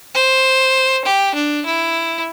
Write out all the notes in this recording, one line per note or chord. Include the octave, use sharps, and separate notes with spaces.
C5
G4
D4
E4